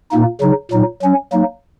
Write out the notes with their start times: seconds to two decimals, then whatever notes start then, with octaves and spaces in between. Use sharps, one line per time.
0.11 A#2 A#3 D#4
0.41 C#3 F#3 D#4
0.71 A#2 F#3 D#4
1.02 F#3 C#4
1.32 F#3 A#3 D#4